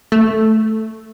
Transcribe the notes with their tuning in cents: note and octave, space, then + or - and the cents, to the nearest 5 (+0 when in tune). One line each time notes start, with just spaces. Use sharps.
A3 +0